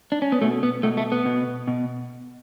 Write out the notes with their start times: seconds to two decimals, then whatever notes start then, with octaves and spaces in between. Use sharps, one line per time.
0.12 D4
0.22 C#4
0.32 B3
0.41 B2 A3
0.63 B3
0.83 B2 A3
0.97 A3
1.12 B3
1.25 B2
1.68 B2